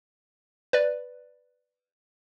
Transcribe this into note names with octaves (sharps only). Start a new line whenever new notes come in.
B4 D5